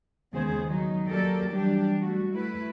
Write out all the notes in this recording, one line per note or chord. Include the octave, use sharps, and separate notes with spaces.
D#2 C#3 G#3 B3 G#4 C5
D#3 F#3 D#4
F#3 A#3 G4 A4 A#4 D5
E3 F#3 G3 D4 G4
G3 A3 F#4
A3 E4 B4